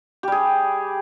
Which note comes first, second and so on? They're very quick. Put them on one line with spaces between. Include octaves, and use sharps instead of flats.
G4 G3 G#4